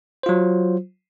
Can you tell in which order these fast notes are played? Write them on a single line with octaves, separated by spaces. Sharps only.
C5 F4 F#3